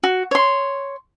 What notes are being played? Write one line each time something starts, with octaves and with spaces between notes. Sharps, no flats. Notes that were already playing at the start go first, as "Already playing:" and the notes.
F#4
C#5 C6